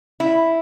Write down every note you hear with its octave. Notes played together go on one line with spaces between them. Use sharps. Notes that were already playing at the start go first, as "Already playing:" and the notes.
E4